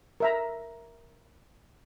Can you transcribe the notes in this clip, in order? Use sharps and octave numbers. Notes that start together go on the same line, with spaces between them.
A#4 E5 A#5